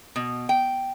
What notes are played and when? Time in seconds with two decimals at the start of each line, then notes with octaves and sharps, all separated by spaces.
0.16 B2
0.49 G5